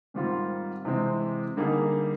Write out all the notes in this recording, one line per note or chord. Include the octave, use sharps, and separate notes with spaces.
G#2 D#3 G3 C4 F4
C3 E3 G#3 C4
D3 G3 A#3 D#4 G#4